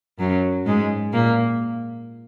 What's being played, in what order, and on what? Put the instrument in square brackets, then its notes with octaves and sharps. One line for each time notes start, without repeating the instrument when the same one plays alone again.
[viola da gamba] F#2 F#3
G#2 G#3
A#2 A#3